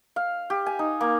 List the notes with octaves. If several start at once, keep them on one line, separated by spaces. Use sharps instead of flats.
F5
G4
G#5
D#4
A#3